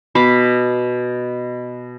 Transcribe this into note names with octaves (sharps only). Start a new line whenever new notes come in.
B2 F5 B5 D6